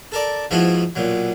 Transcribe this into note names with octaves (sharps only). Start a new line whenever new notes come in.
A4 A#4 D5
G#2 F3 B3 E4 F#4
B1 A#2 F#3